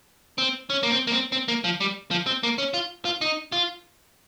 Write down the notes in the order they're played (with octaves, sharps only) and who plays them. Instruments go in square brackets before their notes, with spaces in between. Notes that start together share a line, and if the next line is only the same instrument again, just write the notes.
[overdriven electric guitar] C4
C#4
A#3
C4
A#3
C4
C4
A#3
F3
G3
F3
C4
A#3
C#4
F4
F4
D#4
F4